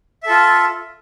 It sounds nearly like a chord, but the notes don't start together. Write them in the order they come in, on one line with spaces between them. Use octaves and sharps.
E5 A4 F4